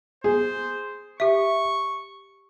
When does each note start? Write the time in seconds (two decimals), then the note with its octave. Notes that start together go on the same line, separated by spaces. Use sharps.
0.24 G#4 C5
1.20 G4 E5 C#6